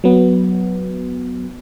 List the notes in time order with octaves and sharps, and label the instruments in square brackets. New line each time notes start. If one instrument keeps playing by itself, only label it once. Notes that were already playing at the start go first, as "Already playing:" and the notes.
[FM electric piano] F#3 B3